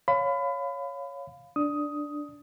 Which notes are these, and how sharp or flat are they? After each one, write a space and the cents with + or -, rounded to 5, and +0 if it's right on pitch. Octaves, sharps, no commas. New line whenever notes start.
C#5 +0 F5 +0 B5 +30
D4 +0 D#6 +10